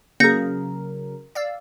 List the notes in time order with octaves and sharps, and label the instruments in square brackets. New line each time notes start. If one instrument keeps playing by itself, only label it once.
[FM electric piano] C#3 F#3 A#4 [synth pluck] A#3 G#4 [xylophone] G6 A#6 C#7
[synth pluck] D5 F5 E6